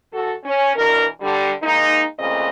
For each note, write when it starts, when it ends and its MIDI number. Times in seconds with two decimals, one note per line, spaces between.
0.13 0.32 40
0.13 0.32 66
0.13 0.32 69
0.44 0.69 61
0.75 1.05 47
0.75 1.05 52
0.75 1.05 62
0.75 1.05 70
1.21 1.51 50
1.21 1.51 55
1.63 2.03 56
1.63 2.03 58
1.63 2.03 63
2.18 2.50 46
2.18 2.50 49
2.18 2.50 57
2.18 2.50 60
2.18 2.50 75